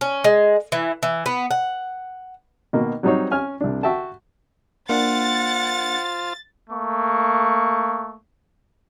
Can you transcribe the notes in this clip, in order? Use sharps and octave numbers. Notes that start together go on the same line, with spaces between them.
C#4
G#3
E3
E3
B3
F#5
B2 D#3 A#3 F#4
F#3 G3 C4 D#4 C5 C#5
C#4 G#5 F6
C2 D4
F#4 E5 G5 A5
A#3 D4 F4 C5 F#5 A6
A3 A#3 C#6